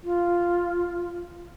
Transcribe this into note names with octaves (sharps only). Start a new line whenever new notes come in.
F4